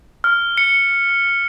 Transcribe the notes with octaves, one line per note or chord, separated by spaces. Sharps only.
F6
C#7